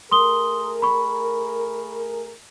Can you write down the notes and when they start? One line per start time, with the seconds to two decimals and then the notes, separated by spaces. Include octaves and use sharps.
0.11 A3 G#4 A#4 C6 D#6 G7
0.82 B5 C#6